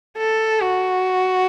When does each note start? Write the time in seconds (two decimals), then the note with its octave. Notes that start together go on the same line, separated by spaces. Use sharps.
0.18 A4
0.61 F#4